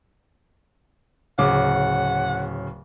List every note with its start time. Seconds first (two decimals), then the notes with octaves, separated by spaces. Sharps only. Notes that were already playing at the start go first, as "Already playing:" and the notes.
1.38 D1 C#3 F#5 D6